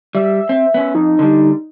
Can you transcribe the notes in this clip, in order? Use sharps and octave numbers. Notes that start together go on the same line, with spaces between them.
G3 E5
C4
B3 C#4
F2 D#4
D3 G3